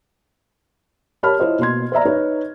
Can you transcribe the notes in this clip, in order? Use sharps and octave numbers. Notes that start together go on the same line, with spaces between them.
G4 A#4 C#5 A5 B5 F6
E4 F4 C5 C#5 D#5
B2 A#3 C6 G#6
C5 D5 E5 A#5
D#4 B4 C#5